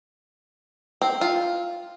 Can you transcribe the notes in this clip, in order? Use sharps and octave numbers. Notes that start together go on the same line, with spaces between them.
C4
F4